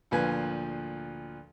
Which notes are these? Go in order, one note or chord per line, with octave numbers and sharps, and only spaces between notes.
D2 A#2 F3 B4 G#5